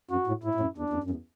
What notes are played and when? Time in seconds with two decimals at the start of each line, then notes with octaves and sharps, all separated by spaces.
0.11 F#2 F#4
0.27 A2
0.44 A2 E4
0.55 A2
0.60 F#2
0.77 E2 D4
0.90 E2
0.93 F#2
1.04 F#2
1.10 E2